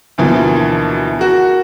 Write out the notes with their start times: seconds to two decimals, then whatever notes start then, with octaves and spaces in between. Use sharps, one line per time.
0.18 D2 B2 E3 F3 A#3
1.19 F#4 A#4